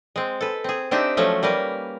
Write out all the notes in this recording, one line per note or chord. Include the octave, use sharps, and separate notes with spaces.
G#3 C4
A4 B4
C4 G#4
C4 D4 D#4 G4 E5
F3 F#3 A3 C#4 F#4
G3 A#3 A#4 B4